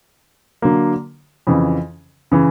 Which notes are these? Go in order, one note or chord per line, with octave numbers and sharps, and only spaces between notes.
D3 F#3 A#3
F2 C#3 E3
C#3 E3